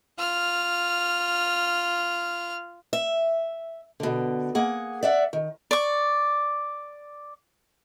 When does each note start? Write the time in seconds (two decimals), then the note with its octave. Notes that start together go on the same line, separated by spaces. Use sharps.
0.18 F4 F6
2.93 E5
4.00 B2 D3
4.55 A#3 G#4 F#5
5.03 D5 E5 F#5
5.33 D#3
5.71 D5 C#6